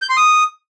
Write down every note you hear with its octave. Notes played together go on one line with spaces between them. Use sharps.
G6
C6
D#6